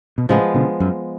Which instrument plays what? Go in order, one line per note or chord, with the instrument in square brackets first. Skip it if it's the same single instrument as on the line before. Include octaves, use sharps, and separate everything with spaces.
[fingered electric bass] B2
[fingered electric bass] A2 C#3 [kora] F3 G#3 B3
[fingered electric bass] B2 D3
F#2